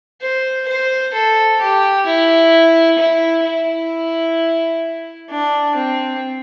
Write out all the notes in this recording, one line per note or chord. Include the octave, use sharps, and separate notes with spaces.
C5
C5
A4
G4
E4
E4
E4
D4
C4